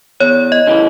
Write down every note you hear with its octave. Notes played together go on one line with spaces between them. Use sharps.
E2 C#5
D#5
C#3 E3